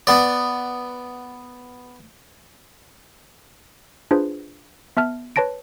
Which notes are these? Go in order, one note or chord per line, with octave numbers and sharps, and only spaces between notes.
B3 D5
D4 F4 G#4 B4 C5
B3 E5 A5 F6
B4 C#5 A5 A#6 D7